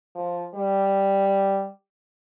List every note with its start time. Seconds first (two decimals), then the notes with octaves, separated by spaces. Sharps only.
0.15 F3
0.54 G3